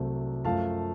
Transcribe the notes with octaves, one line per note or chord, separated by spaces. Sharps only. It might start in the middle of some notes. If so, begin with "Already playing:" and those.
Already playing: C2 C3 F#3 A3 C4
F#2 F3 A3 F5 A5